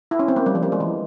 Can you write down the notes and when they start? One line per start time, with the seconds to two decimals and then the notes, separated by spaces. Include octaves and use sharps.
0.11 E4
0.19 C#4
0.28 C4
0.36 A#3
0.46 G3
0.55 F3
0.63 G3
0.72 G#3
0.80 E3